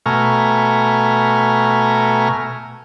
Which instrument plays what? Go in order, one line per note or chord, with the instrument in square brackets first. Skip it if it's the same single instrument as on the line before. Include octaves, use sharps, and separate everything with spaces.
[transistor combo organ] B2 A3 G#5 A#5 C#6 F6